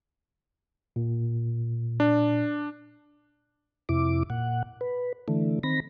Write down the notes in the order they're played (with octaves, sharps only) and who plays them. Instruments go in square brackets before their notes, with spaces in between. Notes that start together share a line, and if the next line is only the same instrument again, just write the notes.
[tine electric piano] A#2
[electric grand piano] D4
[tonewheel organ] F2 C3 E4 D6
A#2 F#5
B4
D3 E3 A3
D#3 C4 B5 A#6